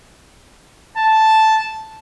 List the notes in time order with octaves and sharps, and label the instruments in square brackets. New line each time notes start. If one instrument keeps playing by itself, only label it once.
[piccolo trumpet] A5